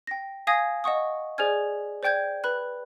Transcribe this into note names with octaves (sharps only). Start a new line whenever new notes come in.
G5 A#6
F5 G#5 D#6 G#6 A#6
D#5 F#5 C#6 D#6
G#4 C5 D5 G#5 F6 G#6
C5 D5 G5 G6 G#6
B4 B5 F#6